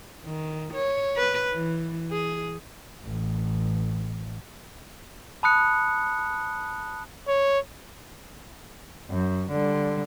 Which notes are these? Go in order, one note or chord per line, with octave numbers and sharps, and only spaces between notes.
D#3
C#5
B4
E3
G#4
A1
A5 B5 D#6 F#6 C#7
C#5
F#2
D3 G3